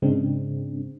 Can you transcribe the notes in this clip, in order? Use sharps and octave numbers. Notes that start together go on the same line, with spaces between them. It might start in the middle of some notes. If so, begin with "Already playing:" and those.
G#2 C#3 G#3 C4 D4